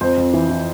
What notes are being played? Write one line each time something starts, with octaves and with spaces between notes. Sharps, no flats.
F2 C5
F2
E3
E3